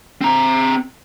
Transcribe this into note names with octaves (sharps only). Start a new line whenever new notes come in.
C4 A#5